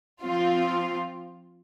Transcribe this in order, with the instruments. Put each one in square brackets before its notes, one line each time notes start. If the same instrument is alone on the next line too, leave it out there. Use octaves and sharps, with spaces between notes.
[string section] F3 C4 F4